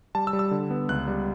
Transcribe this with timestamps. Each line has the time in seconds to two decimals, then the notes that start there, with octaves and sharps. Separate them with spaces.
0.15 G3 A5
0.27 E6
0.33 G3
0.39 E6
0.51 D3
0.70 B3
0.89 C#2 F#6
1.07 G3